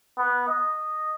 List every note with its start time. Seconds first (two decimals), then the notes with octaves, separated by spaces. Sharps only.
0.18 B3
0.48 D#5